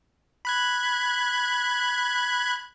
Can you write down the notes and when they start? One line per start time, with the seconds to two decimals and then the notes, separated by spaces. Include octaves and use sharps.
0.45 B5 F#6 G#6